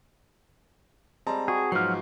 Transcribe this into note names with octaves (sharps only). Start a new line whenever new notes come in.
G3 G#3 C4 A5 A#5
F#4 G#4
G#2 F3 F#3 B3 F6 C7